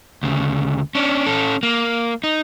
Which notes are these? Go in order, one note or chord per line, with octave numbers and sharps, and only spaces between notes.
D2 C#3
C#4 D4
C#4 A4
A#3
D#4